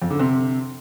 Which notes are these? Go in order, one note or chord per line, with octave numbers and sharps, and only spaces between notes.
F2
D3
C3